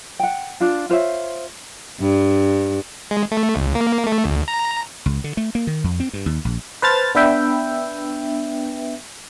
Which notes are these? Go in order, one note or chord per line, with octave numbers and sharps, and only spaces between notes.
F#5 G5
D4 F4
F4 C5 C#5 E5
G2
G#3
A3
C#2
A#3
A3
D2
A#5
C#2
D3
A3
A#3
D#3
F2
C4
G2
D#2
A#1
B4 C5 A5 F6 A6
B3 D4 B4 E5 G5